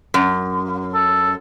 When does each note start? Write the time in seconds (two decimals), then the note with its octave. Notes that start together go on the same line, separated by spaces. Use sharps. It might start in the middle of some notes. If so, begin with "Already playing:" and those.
0.14 F#2
0.94 A4